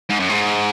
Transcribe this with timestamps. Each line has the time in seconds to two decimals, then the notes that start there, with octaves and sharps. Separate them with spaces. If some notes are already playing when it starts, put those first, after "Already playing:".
0.09 G#2
0.20 F#2
0.29 G#2